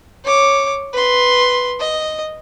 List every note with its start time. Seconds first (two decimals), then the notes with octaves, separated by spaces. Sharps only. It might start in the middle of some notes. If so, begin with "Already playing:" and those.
0.25 C#5 D6
0.93 B4 C6
1.80 D#5